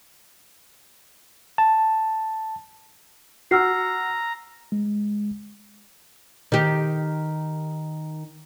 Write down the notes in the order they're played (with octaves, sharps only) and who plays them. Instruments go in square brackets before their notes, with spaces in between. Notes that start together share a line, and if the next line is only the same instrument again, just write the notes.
[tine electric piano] A5
[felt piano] F#4 F#5 [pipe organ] A#5 [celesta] E6 F6 C7
[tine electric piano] G#3
[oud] D#3 G4